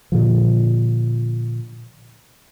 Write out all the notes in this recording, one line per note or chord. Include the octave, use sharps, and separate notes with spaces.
A#2 D3 F3